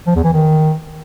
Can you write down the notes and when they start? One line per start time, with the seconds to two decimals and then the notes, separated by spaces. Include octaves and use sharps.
0.07 F3
0.15 E2
0.24 E3
0.33 D#3